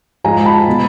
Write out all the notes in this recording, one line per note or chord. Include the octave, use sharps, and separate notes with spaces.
G#2 F3 G#3 G#5 A#5
A5 B5
B2 G#3 B3